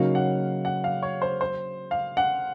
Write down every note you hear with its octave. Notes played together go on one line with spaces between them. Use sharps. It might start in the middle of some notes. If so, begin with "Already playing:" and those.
Already playing: C#3 F#3 A#3 D#4 F#4 F5
F#5
F#5
F5
C#5
C5
C5
F5
F#5